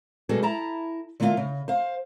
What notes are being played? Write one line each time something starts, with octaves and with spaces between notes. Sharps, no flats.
B2 G3 F#4 G#4 A4
E4 A5 A#5
D3 A3 A#3 D4 F4
C#3
C5 F5